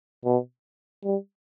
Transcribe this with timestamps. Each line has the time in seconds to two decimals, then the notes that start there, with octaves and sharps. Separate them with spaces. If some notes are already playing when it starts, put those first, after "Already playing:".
0.25 B2
1.04 G3